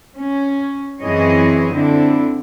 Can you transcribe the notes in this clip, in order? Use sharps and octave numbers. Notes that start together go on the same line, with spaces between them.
C#4
F#2 E3 C4 G#4 C#5 D#5
D3 C4 D4 E4